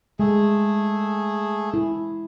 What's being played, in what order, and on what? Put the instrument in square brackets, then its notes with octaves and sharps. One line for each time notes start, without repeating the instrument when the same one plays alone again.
[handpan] G#3 [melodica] A3 G#4
[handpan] E4